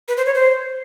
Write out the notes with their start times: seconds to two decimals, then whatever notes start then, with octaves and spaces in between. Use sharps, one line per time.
0.08 B4
0.17 C5
0.26 C#5
0.35 C5